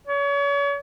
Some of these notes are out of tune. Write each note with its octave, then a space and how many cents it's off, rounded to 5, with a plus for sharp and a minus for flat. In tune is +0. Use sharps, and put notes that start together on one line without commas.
C#5 +35